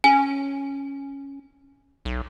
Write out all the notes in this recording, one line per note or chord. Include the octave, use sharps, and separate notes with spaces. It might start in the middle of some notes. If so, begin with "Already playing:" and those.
C#4 G#5
B1